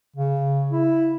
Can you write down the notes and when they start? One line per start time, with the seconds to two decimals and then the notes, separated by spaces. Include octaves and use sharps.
0.16 C#3
0.72 E4